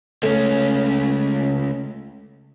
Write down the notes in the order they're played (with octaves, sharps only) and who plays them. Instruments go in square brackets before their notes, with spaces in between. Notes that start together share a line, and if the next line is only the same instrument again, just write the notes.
[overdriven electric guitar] C#2 C#4 [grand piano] A3